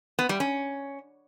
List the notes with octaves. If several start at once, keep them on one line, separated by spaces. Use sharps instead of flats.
B3
G3
C#4